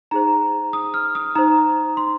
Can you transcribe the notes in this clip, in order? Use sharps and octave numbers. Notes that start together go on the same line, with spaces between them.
D#4 G#4 C5 A#5
D#6
F6
D#6
D#4 C5 A#5
C6